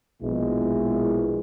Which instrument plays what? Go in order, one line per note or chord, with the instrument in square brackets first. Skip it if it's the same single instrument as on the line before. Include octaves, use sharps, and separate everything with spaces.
[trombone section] A#1 B2 G#3 E4